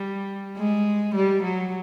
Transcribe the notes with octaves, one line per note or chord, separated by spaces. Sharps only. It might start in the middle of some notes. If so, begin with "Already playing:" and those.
Already playing: G3
G#3
G3
F#3